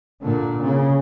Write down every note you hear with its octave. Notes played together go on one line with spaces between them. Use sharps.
A#2 D3
C#3